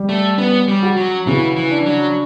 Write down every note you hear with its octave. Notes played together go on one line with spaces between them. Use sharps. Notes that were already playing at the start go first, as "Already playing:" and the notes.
Already playing: G3
A3
B3 C#4
G3
F#4
F#3
C#3 E3
E3
D4
F#3